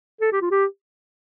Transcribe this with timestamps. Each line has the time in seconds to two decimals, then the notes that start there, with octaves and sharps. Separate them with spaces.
0.21 A4
0.32 G4
0.41 F4
0.51 G4